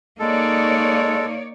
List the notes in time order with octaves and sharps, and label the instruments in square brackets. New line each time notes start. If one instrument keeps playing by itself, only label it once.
[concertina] G#3 A4 [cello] A#3 [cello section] D#4 C#5 D5